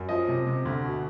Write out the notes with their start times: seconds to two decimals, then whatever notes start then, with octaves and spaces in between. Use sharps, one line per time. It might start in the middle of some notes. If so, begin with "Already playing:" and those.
Already playing: F#2
0.09 F3 D#5
0.28 C3
0.47 C3
0.65 D2
0.83 B2